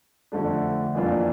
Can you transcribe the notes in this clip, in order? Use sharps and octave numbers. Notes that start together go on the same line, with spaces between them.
F2 D3 A3 D4
F2 E3 A#3 D4 F4